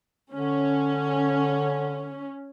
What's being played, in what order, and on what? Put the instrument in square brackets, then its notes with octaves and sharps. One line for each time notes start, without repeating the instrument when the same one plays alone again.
[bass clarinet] D3 [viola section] C#4